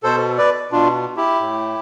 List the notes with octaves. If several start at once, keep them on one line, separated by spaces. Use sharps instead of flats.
B2 A4 C5
B4 D5
B2 D4 F4
E4 G4
A2